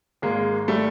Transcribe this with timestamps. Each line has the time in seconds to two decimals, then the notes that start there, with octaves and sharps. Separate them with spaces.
0.22 G#1 G#3 A#3
0.68 G3 A3